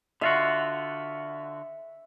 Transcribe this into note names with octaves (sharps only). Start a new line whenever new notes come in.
D3 F4 F#4 E5